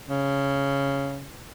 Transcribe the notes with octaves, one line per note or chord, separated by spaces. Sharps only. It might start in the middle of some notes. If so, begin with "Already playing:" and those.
C#3